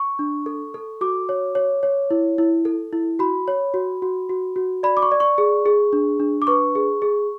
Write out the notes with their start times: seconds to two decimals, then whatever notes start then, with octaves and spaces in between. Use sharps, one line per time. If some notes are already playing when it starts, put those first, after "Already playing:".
Already playing: C#6
0.19 D4
0.46 A4
0.74 A4
1.01 F#4 D6
1.29 C#5
1.55 C#5
1.83 C#5
2.11 E4
2.38 E4
2.65 A4
2.93 E4
3.19 F#4 B5
3.48 C#5
3.74 F#4
4.02 F#4
4.29 F#4
4.56 F#4
4.83 D5 B5
4.97 D6
5.02 C#6
5.12 D5
5.20 C#6
5.38 G#4
5.66 G#4
5.93 D4
6.20 D4
6.42 D6
6.47 B4 C#6
6.75 G#4
7.02 G#4